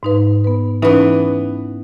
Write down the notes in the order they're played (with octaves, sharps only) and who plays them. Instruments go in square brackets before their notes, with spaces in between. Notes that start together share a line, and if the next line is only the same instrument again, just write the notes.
[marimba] G#2 D#4 B4
B3 B4
[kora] E3 B3 [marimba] C#4 D#4